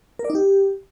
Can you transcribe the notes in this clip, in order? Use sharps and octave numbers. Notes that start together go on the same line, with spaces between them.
A#4
D5
D#4
G4